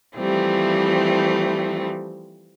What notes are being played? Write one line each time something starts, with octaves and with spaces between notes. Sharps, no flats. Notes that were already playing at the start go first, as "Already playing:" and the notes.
E3 F3 G3 A3 C4